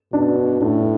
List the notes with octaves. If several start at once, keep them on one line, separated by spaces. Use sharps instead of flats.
B2 D4
A2 D4